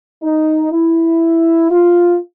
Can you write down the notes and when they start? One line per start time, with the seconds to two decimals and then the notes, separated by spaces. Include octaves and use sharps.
0.23 D#4
0.72 E4
1.71 F4